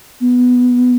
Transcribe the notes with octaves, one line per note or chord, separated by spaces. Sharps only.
B3